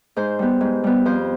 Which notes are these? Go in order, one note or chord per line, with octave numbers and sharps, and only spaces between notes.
G#2 C5
G3 B3
G#2
G3 B3
F2 C5